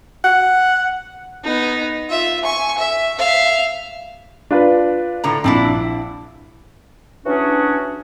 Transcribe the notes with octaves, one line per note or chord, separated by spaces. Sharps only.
F#5
B3 D#4
F4 E5
G#5 C#6
E5
E5 F5
D4 F4 B4
A2 D3 A#5
A#1 C4 D4 E4
E3 F#3 C#4 D4 F#4 G#4